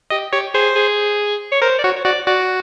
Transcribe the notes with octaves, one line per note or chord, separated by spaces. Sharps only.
G4 D#5
G4 C#5
G#4 C5
G#4
C#5
A#4 C5
D5
F#4 C#5
C#5
F#4 D5
F#4 D5